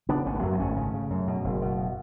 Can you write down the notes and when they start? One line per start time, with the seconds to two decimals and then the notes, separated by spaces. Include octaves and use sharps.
0.09 C#3 B3 D4
0.26 G#1 A3 C#4
0.35 B3
0.42 F#2 F#3 A3
0.53 B3
0.59 G#1 A3 C#4
0.77 C#3
0.94 C#3
1.10 F#2
1.28 B2
1.44 F#1
1.62 B2